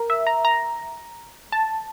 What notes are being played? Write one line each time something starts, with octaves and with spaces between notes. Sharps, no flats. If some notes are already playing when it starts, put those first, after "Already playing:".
Already playing: A#4
E5
A#5
A#5
A5